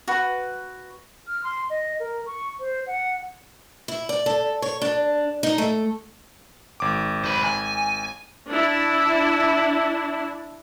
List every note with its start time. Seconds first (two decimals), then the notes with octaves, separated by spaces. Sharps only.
0.08 F#4 B4
1.28 F6
1.44 C6
1.70 D#5
2.00 A#4
2.26 C#6
2.60 C5
2.87 F#5
3.88 E4
4.09 D5
4.26 A4
4.62 C#5
4.82 D4
5.43 D#4
5.58 A3
6.80 G#1 D6
7.24 C5 B5
7.44 G#5
8.49 D4 E4